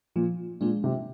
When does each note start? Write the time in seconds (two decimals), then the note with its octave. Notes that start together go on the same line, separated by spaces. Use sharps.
0.16 A#2 F3
0.61 A#2 G#3 D4
0.84 C3